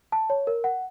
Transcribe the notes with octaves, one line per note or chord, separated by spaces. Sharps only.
A5
C#5
A#4
F#5